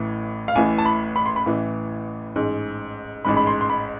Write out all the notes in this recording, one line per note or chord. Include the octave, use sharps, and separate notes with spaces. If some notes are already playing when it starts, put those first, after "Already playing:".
Already playing: A1 A2 E3
F5
A1 A2 E3 G#5
A5
B5
B5
C6
B5
A1 A2 E3
A1 G#2 G#3
A1 G#2 G#3 B5
B5
C6
C6
B5